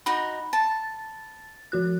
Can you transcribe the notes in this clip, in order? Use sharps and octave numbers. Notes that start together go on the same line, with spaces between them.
D#4 F#4 B5
A5 A6
F3 F#4 F#6